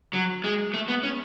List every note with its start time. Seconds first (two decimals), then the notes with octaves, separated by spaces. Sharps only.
0.13 F#3
0.44 G#3
0.74 A3
0.88 B3
1.03 C#4